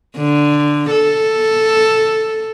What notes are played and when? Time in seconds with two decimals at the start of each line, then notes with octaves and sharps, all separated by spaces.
0.17 D3
0.91 A4